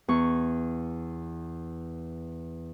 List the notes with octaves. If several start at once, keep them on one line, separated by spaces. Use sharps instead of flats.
E2 C#6